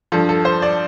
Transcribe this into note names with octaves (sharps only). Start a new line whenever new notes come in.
G2 F3 A4
A4
C5
D5